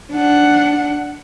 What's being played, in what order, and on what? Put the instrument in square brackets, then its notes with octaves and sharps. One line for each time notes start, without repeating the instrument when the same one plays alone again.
[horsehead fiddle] D4 F#5